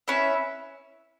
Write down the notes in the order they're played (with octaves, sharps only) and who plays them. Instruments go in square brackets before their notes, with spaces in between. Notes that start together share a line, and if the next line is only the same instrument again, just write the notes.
[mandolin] C#4 E4 B4 E5